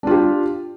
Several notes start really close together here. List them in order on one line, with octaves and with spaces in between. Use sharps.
D4 F4 G4